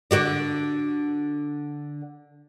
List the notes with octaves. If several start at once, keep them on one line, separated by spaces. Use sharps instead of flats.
D3 F#4 D5